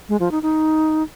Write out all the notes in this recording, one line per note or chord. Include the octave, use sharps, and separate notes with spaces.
G#3
F3
D#4
D#4